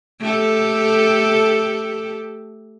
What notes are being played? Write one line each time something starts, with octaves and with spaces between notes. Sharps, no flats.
A3 G4 A4